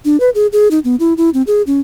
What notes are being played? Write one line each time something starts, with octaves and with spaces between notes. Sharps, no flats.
D4
B4
G#4
G#4
D#4
B3
E4
E4
C4
G#4
C#4